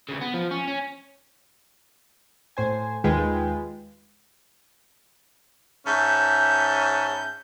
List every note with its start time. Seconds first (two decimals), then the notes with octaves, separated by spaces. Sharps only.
0.09 D2 C#3
0.21 B3
0.34 F3
0.51 C#4
0.68 C#4
2.57 A2 C5 G#5
3.04 D#2 D#3 G#3 F4 B4 G5
5.86 G#2 C#4 E5 A5 B5 G6